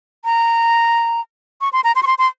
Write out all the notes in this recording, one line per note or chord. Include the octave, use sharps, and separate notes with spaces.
A#5
C#6
C6
A#5
C6
C#6
C6
C6